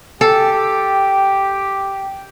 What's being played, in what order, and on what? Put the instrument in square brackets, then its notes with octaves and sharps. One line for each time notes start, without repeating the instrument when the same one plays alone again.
[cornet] G4 [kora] A4